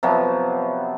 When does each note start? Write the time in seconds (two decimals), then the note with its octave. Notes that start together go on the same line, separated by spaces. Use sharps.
0.03 C3 F3 F#3 B3